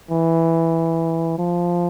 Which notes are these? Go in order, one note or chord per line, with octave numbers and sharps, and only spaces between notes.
E3
F3